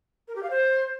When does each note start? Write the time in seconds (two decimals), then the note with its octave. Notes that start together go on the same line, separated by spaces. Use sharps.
0.28 A#4
0.35 G4
0.43 F5
0.50 C5